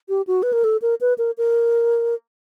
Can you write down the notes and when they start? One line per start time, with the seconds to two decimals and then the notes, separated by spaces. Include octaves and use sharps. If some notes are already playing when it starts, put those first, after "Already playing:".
0.09 G4
0.27 F#4
0.43 B4
0.53 A#4
0.64 A4
0.82 A#4
1.01 B4
1.18 A#4
1.38 A#4